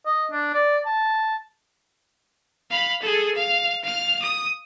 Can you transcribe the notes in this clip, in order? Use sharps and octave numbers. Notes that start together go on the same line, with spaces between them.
D#5
D4
D5
A5
F5 B5
G#4 A4
F5
F5 F6
D#6